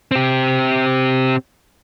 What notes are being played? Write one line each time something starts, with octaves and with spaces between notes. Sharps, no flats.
C4 G4